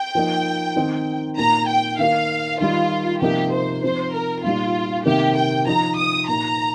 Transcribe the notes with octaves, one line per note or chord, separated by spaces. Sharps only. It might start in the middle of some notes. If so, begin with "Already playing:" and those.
Already playing: G5
F3 A#3 D#4
D#3 C4 D#4
A#2 A#3 D#4 A#5
G5
D#3 A#3 D#4 F5
D#3 G3 D#4 F4
C3 F3 A#3 D#4 G4
C5
F3 C4 D#4 C5
A#4
A#2 G3 D#4 F4
C3 D#3 A#3 D#4 G4
G5
F3 D#4 A#5
D#6
A#2 A#3 D#4 A#5